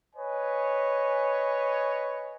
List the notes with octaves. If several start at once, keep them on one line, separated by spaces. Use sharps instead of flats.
B4 C#5 D#5 G#5